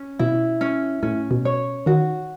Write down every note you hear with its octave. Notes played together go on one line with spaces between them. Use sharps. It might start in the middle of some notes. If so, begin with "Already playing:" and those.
Already playing: C#4
B2 E4
C#4
A2 C#4
B2
C#5
D#3 F#4